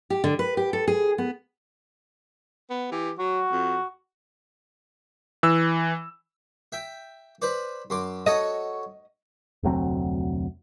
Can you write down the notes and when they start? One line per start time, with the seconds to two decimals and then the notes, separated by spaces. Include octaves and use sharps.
0.10 G4
0.24 D3
0.39 B4
0.57 G4
0.73 A4
0.88 G#4
1.18 B3
2.70 B3
2.92 E3 G4
3.19 F#3 F#4
3.52 F2
5.43 E3 E6
6.72 E5 G5
7.42 B4 C5 D5
7.90 F#2 C6 D6
8.26 F#4 A4 C#5 D#5
9.63 F1 D2 F#3 C4